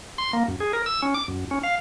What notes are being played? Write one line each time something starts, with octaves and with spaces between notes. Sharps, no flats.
C6
A#3
F#2
G#4
A#4
E6
C#4
D6
F#2
C#4
F5